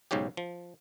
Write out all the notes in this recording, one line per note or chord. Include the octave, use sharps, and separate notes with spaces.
B1 G#2 C#3 C#4 G4
F3